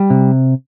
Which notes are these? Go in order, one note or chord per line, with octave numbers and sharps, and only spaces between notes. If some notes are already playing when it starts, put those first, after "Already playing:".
Already playing: G3
C3